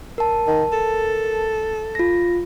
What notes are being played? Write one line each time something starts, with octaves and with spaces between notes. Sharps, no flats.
A#4 A5
D#3
A4
F4 A#6